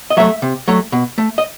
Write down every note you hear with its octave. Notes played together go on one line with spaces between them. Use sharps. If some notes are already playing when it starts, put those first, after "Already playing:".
D#5
F#3 A3 E5
C3
F#3 A3
B2
A3
D#5